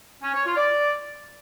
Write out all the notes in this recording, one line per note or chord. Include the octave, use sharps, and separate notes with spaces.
C#4
C#5
F4
D5